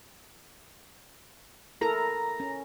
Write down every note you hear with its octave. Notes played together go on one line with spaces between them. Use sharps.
E4 A4 A#4 A#5
C#4